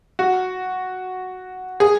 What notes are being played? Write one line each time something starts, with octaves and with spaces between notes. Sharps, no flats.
F#4
G#4